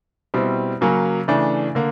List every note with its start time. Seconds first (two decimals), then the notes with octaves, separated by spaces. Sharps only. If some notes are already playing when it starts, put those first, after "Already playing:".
0.34 B2 G3 C4 E4
0.81 C#3 F#3 A#3 C#4
1.28 C#3 E3 A3 D4
1.75 D3 A#3